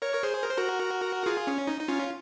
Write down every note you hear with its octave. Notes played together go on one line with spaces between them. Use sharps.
A#4 C#5
A#4
G#4 C5
A#4
C5
F#4 A#4
F4 G#4
C#4
D#4
D#4
C#4 F4